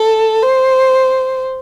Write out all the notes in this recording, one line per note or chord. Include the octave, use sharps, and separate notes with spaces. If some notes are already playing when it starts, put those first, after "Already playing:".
Already playing: A4
C5